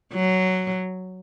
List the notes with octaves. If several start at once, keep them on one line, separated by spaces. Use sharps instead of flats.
F#3